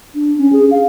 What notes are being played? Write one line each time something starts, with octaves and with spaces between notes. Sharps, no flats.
D4
C#4
G#4
F5